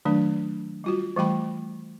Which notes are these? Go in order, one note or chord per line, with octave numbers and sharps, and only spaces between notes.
D#3 F#3 A3 D4
G3 F4 F#4
E3 G3 A3 G5 B5